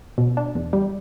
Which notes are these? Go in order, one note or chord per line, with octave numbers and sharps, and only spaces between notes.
B2
D4
E2
G3